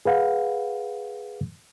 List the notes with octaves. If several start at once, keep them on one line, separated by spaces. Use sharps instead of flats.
G#4 B4 F5 F#5